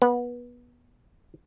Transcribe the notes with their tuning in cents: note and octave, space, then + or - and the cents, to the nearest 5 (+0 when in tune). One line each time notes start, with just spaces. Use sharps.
B3 -20